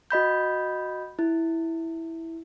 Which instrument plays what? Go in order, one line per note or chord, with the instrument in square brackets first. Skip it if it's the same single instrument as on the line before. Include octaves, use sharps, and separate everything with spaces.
[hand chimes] F#4 D#5 B5 G6
E4